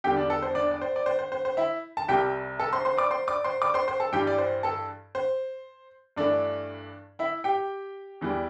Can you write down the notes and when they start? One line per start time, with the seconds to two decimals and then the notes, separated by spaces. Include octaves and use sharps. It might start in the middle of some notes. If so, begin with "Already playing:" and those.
0.04 E2 D3 G3 G4 G5
0.17 D4 D5
0.30 A4
0.42 C5
0.55 D4 D5
0.71 D5
0.81 C5
0.96 D5
1.06 C5
1.19 C5
1.32 C5
1.45 C5
1.57 E4 E5
1.97 A5
2.08 C2 C3 G3 G4 G5
2.60 A4 A5
2.73 C5 C6
2.85 C5 C6
2.97 D5 D6
3.10 C5 C6
3.28 D5 D6
3.44 C5 C6
3.62 D5 D6
3.74 C5 C6
3.88 C5 C6
4.00 A4 A5
4.12 G2 E3 G3 G4 G5
4.27 D5
4.38 C5
4.63 A4 A5
5.15 C5
6.16 G2 E3 A3 D4 D5
7.19 E4 E5
7.44 G4 G5
8.21 E2 E3 G3